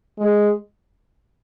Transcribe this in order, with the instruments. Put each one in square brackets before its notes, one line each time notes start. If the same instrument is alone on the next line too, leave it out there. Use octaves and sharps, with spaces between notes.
[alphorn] G#3